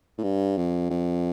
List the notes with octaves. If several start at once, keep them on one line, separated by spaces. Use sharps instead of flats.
A2
G2
F2
F2